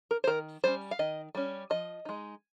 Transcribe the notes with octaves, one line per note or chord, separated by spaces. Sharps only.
A#4
C5
D#3 A#4
G3 C#4 C5
F5
D#3 D#5
G3 C#4
F3 D#5
G#3 D#4